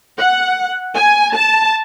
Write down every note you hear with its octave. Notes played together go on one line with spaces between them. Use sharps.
F#5
G#5
A5